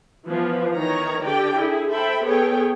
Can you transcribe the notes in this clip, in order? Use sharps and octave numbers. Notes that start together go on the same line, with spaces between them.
E3 F3 B3
D#3 E3 C#5 A#5
D3 G4 D5 G5
E4 G#4
A4 C5 E5 G5 B5
B3 G#4 A4 C#5 G5